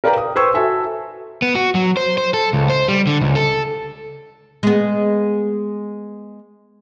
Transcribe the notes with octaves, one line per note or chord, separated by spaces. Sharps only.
A#4 B4 D5 F5 G5 A#5
D#6
B4 C5 G5 C#6 E6 G#6
F#4 A4 E5 G#5
B3
F#4
F#3
C5
C5
A4
C#2
C5
G3
D3
C#2
A4
G#3 B3